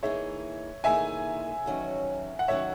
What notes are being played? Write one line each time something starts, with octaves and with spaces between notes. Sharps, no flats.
E3 A#3 D#4 G#4 C#5 E5
E3 A#3 D#4 G#4 E5 G#5
E2 D#3 F#3 C#4 F#4
F#5
E2 D#3 F#3 C#4 F#4 C#5 E5